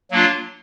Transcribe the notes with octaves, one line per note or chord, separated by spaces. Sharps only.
F#3 A#3 D4 F4